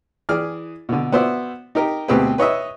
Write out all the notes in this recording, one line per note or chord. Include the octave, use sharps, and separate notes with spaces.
E3 G#4 D5 F6
B2 D3
B3 F#4 C5 D5 E5
D#4 G4 A#4
D2 B2 C4 G4 G#4 B4
B4 C#5 D#5 E5